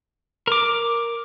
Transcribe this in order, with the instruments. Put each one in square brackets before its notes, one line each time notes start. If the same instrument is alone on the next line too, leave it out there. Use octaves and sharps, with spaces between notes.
[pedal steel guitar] A#4 D6